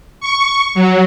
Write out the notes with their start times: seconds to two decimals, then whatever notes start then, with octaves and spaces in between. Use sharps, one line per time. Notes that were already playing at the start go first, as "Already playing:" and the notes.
0.21 C#6
0.75 F#3